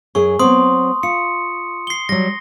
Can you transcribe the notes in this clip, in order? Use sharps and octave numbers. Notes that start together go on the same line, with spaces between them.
F#2 G#4 C#6
F#3 B3 C4 C6 D#6
F4 C#7
C7 G7
F#3 G3 A#6